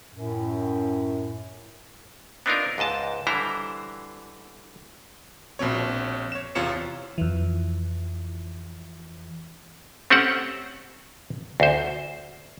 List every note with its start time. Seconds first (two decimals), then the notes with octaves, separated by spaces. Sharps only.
0.13 F#2 A2
2.46 B3 C4 D4 D#4 F4 A#4
2.78 C#2 G#2 D#5 A5
3.27 D3 E3 G3 E4 C5 A#5
5.59 A#1 B2 C4 C#5
6.32 C#5 E7
6.55 E2 C3 F4 C#5 C#7 E7
7.18 F2 E3
10.10 A3 C4 C#4 G4 C5 F#5
11.60 D2 C5